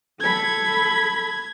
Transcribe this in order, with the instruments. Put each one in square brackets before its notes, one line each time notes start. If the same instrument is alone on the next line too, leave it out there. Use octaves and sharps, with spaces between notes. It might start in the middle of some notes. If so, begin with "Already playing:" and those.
[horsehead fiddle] A4 B5 [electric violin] G#6